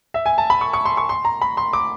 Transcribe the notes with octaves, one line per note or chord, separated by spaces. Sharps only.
E5
G#5
A5
B5
C#6
C#6
C6
C#6
C6
A#5
B5
C6
D6